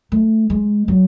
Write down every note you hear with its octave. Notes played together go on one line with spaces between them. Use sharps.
A3
G#3
F#3